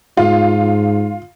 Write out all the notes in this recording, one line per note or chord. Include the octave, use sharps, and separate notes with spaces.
G#2 F4